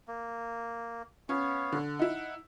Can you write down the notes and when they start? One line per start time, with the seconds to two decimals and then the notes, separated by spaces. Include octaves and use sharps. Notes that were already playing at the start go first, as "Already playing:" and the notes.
0.08 A#3
1.29 B3 C#4 C#5 F5
1.72 D3
1.99 D#4 E4 F#5